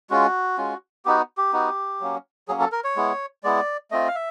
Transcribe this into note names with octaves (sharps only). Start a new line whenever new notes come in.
G#3 C#4 F4 F#4
G#3 C#4 F4
B3 D#4 F#4 G4
G4
B3 D#4 F#4
F#3 A#3 C#4
F#3 A#3 C#4 G#4
A4
A#4
C#5
G#3 B3 E4
G#3 B3 E4 D5
A3 C4 F4 D#5
F5
E5